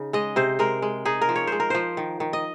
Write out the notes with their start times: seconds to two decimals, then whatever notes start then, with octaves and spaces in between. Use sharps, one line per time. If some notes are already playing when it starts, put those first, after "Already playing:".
Already playing: C#3 D#4
0.13 G#3 D#5
0.36 C3 C5
0.59 G#3 A#4
0.82 G#3
1.05 D#4 G#4
1.21 A#4
1.29 F3
1.36 C#5
1.47 G#3 C5
1.60 A#4
1.70 F3 C5
1.97 D#3
2.20 D#3
2.33 D#5